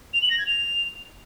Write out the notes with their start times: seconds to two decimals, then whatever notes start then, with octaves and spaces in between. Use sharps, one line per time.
0.14 F7
0.22 F#7
0.30 A#6
0.38 G#6
0.47 F7